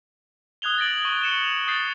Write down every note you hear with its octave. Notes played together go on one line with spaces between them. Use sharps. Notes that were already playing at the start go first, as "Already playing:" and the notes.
D#6 F#6 G#6 F7 G7
A6 A#6 D7 F#7
C#6
C#7 E7 G7
F7
D#6 G6 A6 C7